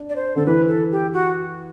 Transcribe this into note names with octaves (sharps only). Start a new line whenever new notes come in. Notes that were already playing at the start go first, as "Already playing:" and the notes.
Already playing: D4
D5
C5
D3 A4
E3 B4
A4
G4
F#4